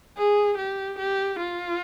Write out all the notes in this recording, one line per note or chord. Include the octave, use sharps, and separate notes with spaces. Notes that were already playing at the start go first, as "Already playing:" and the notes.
G#4
G4
G4
F4